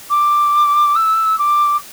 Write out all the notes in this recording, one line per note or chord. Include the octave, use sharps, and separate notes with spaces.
D6
E6
D6